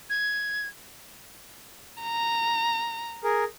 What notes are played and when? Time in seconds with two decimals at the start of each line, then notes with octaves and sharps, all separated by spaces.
0.10 G#6
2.03 A#5
3.24 G#4 A#4